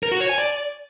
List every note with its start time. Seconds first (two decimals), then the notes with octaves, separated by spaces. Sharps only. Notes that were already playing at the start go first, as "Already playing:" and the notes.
0.03 A#4
0.12 F#4
0.20 C#5
0.29 G#5
0.38 D5